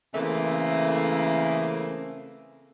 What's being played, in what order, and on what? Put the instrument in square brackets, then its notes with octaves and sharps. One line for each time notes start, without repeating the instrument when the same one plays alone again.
[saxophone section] C#3 E3 A3 A#3 C4